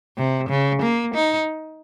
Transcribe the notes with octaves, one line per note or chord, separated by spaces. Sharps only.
C3
C#3
A#3
D#4